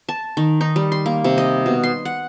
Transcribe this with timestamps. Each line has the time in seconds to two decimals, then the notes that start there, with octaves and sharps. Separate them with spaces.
0.09 A5
0.37 D#3
0.61 D#4
0.76 G3
0.92 C6
1.06 A#3
1.24 C3
1.38 D#5
1.66 B2
1.83 C6
2.05 F#5